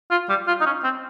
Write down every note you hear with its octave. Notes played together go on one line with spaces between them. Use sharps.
F4
G3
F4
D#4
C#4
C4